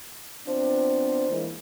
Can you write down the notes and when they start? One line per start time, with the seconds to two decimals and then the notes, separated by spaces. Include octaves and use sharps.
0.48 F3 B3 C4 D4
1.29 E3 G#3 A#3